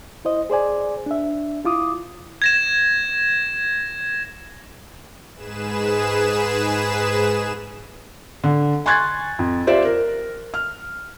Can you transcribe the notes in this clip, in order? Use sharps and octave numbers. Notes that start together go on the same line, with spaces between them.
E4 C5 D#5
G#4 C5 D5 G#5
D4 E5
E4 F4 D6 D#6
G#6 A#6 E7
G#2 G#4 B4 E7
D3
G#5 C6 C#6 F#6 G#6 A6
F2
F4 G4 C5 D5 E5 F5
A#4
F6